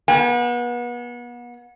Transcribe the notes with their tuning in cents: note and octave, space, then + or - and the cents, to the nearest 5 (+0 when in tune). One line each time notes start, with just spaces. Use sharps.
B3 -35 G5 +45